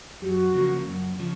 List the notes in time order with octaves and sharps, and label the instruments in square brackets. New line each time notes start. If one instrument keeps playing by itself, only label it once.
[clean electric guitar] F#2 [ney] F#4 G4
[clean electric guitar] C#3 F3 A#3
F#2
C#3 F3